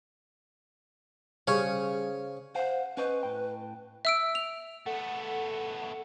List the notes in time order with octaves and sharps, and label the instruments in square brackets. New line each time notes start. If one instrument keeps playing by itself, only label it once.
[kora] C#3 C#4 [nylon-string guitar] G3 [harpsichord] G#4 C#5 [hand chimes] C5 F5
[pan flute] C5 [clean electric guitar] F5 F#5
[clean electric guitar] C#4 C5 D#5 [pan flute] B4
[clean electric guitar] A2 G5
[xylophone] E5 E6 D7
F7
[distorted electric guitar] A3 B3 [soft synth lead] A4 [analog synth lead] F#5